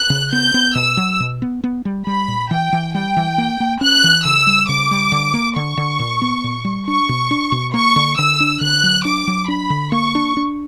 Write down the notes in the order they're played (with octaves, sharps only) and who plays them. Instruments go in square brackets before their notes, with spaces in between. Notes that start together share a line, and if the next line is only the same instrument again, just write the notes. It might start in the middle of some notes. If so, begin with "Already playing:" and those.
Already playing: [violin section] F#6
[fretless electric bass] C#3
[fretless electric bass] B3 [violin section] G6
[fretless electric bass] B3
[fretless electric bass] B2 [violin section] E6
[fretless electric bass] F#3
B2
B3
B3
G3
[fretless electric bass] G3 [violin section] B5
[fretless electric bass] A#2
[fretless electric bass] E3 [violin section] G5
[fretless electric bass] E3
[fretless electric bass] G3 [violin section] G5
[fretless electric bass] E3
A#3
A#3
[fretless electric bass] C#4 [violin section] F#6
[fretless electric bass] E3
[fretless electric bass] C#3 [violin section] E6
[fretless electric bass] G3
[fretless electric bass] C#3 [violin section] D6
[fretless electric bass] G3
D3
A#3
[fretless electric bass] D3 [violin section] C#6
[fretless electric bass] D3
A#2
B3
A#2
G3
[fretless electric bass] D4 [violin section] C#6
[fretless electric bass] B2
D4
B2
[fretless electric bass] A#3 [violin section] C#6
[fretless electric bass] D3
[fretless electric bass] D3 [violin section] E6
[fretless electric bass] D4
[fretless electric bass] D3 [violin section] F#6
[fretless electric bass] F#3
[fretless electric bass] D4 [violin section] D6
[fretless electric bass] F#3
[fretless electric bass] D4 [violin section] B5
[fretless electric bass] D3
[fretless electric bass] A#3 [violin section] C#6
[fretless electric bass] D4
D4